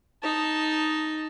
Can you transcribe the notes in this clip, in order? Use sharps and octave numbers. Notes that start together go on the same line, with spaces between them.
D#4 A5